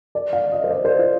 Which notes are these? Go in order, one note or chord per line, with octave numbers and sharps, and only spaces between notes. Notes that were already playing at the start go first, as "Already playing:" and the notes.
D5
F5
D#5
C5
D5
C5
F4